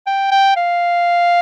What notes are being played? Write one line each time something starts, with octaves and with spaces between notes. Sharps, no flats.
G5
G5
F5